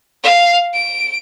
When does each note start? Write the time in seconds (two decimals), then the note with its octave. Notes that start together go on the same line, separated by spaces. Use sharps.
0.23 F5
0.73 D7